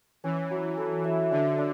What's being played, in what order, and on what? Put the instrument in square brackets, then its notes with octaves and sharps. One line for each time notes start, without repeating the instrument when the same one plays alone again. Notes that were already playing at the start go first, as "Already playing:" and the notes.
[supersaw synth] E3 [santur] C#4
[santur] F#3
A4
E5
[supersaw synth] D3 [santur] D4
[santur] D4